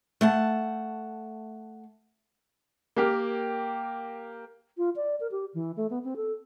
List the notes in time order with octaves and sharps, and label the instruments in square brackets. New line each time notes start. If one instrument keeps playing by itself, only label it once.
[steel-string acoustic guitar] A3 F#5 A5
[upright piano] A#3 G4 A#4
[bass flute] F4
D5
A#4
G4
E3
A3
B3
C4
A4